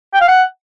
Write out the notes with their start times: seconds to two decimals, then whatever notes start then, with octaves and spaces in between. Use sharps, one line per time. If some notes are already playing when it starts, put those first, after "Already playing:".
0.13 G5
0.21 F5
0.28 F#5